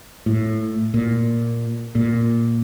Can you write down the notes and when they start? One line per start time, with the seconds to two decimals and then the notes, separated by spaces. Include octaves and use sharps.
0.26 A2
0.94 A#2
1.95 A#2